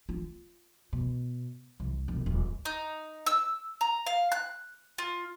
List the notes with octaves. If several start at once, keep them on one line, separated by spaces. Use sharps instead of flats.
F4
B2
C2
E1
D#1
D#4
E6
A#5
F5
F#6
F4